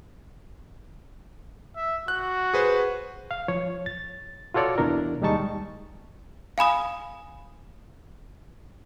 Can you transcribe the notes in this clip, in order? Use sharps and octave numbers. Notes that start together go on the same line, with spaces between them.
E5
F#4 F#6
G#4 B4 C5
F5
F3 C#5
A6
F4 F#4 A4 C#5 D5
E2 B2 E3 D4 A#4
D#2 G3 G#3 D#4 A5 C#6
F5 G#5 B5 D#6